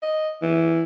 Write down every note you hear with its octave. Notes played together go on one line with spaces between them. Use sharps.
D#5
E3